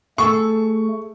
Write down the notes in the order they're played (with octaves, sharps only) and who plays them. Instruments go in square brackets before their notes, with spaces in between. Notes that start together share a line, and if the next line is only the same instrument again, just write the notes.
[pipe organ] A3 [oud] G#4 A4 [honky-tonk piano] C#6